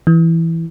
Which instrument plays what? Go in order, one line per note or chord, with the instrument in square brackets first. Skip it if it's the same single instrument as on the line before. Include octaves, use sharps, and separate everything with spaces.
[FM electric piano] E3